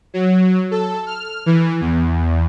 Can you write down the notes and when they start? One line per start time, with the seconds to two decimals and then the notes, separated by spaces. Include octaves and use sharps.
0.14 F#3
0.71 A4
1.07 F6
1.46 E3
1.81 E2